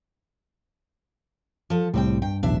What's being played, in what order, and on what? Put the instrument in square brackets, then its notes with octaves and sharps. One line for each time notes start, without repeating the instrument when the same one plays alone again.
[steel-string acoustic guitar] F3 A4
[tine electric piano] C2 A2 [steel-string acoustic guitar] G3 C4 G5
[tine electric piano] G2 [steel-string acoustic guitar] G5
[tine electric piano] B1 E2 A2 [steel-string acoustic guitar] D4 E5